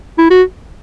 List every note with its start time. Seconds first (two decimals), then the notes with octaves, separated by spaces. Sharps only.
0.18 E4
0.30 F#4